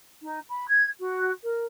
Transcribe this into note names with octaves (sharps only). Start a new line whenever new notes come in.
D#4
B5
G#6
F#4
A#4